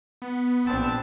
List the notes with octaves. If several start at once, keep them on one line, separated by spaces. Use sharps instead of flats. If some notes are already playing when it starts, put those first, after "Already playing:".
B3
A#1 C4 D4 A5